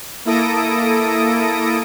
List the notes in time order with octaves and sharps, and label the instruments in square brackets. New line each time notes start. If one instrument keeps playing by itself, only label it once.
[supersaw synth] A#3 E4 A4 D#6 A#6 D7